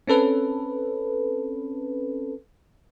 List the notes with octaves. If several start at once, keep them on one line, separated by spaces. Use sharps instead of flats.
C4 C#4 A4 B4